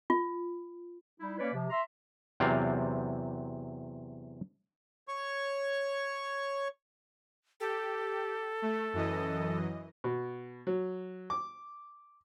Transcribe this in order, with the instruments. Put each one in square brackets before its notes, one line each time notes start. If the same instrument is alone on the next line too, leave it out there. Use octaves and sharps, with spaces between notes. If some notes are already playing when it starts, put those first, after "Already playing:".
[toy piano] F4
[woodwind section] G3 D#4 E4
A#3 C#4 B4 C#5 D5
C3 F3
E5 A#5 C6
[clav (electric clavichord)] E2 C3 F#3 C4 D5 F5
[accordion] C#5 C#6
[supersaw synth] G4 [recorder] A4
[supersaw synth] A3
F#2 E3 D#5
[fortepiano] B2
F#3
D6